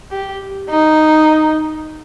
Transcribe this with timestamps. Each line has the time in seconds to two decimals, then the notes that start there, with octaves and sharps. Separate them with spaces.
0.11 G4
0.70 D#4